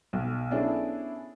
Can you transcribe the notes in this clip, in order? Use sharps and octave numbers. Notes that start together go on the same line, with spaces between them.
B1
B3 C#4 D4 E4 G#4 A4